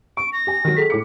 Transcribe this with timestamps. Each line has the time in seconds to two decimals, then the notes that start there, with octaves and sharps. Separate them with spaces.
0.17 C#6 D7
0.33 A#6
0.47 G4 G#5
0.65 D#3 F#3
0.77 G#4 A4 B6
0.90 A2 D6 C#7